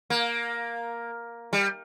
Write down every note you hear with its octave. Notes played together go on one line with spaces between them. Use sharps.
A#3
G3